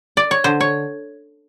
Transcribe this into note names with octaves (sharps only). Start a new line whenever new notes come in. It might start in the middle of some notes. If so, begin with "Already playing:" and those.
D5
C#5
D3 C5
C#5